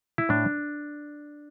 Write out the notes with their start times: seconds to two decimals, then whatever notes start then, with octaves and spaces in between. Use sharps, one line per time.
0.18 E4
0.29 A2 D4